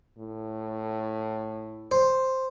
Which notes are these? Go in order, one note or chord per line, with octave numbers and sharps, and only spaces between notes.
A2
C5